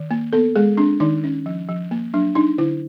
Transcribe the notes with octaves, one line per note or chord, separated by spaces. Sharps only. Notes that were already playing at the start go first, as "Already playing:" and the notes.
Already playing: D#3
A#3
B3 A4
G#3 G#4
C4 D4
D#3 D#4
C#4
F3
F3
A#3
F#3 D4
D4 D#4
D3 E4